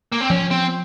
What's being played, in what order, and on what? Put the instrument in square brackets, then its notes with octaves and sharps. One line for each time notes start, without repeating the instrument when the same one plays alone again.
[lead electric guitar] A#3
C4
[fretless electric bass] F3 [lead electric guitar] C#4
[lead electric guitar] C4